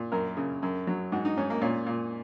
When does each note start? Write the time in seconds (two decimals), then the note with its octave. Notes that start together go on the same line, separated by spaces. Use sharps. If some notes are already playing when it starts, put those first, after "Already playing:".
Already playing: A#2
0.12 F#2 A#4
0.37 C#3
0.63 F#2
0.87 F#3
1.12 G#2 F#4
1.25 D#4
1.37 G#2 C#4
1.50 A#3
1.62 A#2 C#4
1.86 A#2